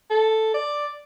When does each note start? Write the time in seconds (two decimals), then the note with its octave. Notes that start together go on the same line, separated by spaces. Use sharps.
0.10 A4
0.54 D5